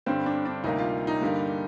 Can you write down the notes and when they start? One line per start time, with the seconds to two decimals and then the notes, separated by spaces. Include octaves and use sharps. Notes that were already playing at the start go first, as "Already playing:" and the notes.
0.06 G2 D3 G3 C4
0.26 D4
0.45 D4
0.64 D2 C3 G3 A#3 D#4
0.78 F4
1.07 D#4
1.21 G2 D3 G3 A#3